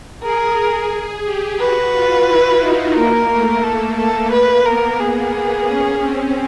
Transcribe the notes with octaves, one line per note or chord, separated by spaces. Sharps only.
G#4 A#4
G#4
G4
F#4 B4
F4
E4
D#4
A#3 A#4
A3
A#3 A4
A3 A4
A#3 B4
B3 A#4
G#4
C#4
C4